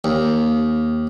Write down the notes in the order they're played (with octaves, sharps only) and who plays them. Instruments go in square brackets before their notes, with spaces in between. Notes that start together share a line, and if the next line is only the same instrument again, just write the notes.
[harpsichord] D#2